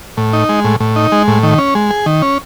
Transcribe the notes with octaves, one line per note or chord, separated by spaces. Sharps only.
A2
D#4
G#3
A2
A2
D#4
G#3
A2
D#3
C#4
G#3
G#4
D#3
C#4